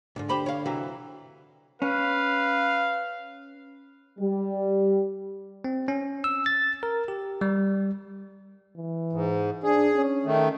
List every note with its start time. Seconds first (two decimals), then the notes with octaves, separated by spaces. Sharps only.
0.16 B1 G#2 D3
0.29 G4 C5 B5
0.46 C#5 F5
0.66 C3 E3 F#3
1.82 C#4 B4 F5
4.19 G3
5.64 C4
5.88 C#4
6.24 E6
6.46 A6
6.83 A#4
7.08 G4
7.41 G3
8.76 E3
9.13 G#2
9.63 D4 G#4
9.95 C#4
10.25 D#3 A3